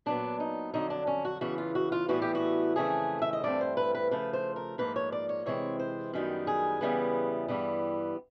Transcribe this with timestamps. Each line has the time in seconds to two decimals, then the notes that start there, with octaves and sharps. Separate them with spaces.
0.06 A#2 F#3 B3 D4
0.40 D#4
0.73 F2 D3 F#3 D#4
0.90 D4
1.07 C#4
1.25 F#4
1.41 E2 C#3 E3 F#4
1.58 F4
1.75 F#4
1.92 F4
2.08 A2 E3 G3 B3 F#4
2.22 G4
2.35 F#4
2.76 F2 C#3 E3 A3 C4 G#4
3.22 E5
3.33 D#5
3.44 G2 E3 A3 C4 D5
3.61 C5
3.77 B4
3.95 B4
4.11 C#3 F3 A3 B4
4.33 C5
4.56 A#4
4.78 G#2 F3 A#3 B4
4.96 C#5
5.12 D5
5.29 C#5
5.46 C3 E3 G#3 C4 C#5
5.79 C5
6.13 F#2 D#3 G3 B3
6.47 G#4
6.81 E2 C#3 E3 G3 B3
7.48 G2 E3 G3 B3